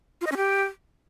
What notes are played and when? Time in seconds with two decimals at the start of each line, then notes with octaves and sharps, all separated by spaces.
0.21 F4
0.26 D#5
0.31 C#4
0.37 G4